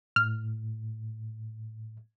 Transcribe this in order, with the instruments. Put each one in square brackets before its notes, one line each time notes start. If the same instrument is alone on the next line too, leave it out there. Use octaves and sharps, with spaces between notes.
[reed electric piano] A2 [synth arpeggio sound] F6